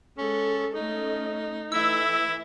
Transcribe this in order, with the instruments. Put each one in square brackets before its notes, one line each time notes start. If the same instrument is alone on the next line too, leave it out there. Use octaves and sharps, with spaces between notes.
[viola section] G#3 A4 [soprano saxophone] C#4
[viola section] A3 C#4 D#5 [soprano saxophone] D#4
[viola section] E3 A3 E5 [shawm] E4 [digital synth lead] E6